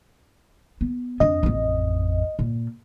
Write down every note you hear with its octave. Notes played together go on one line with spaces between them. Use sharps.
B3
F2 D4 D#5
A1 F2
A#2